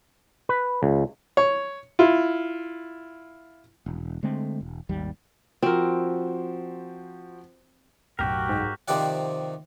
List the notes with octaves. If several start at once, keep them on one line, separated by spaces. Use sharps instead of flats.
B4
C#2
C#5
E4 F4
E1
D3 G#3 A3 C4
E1
G#1 D#2 G3
F3 C4 F#4 A#4 C5
B1 F#2 A2 F#4 G4 A#4 G5
G#2
C3 D#3 F3 G4 D5 F#5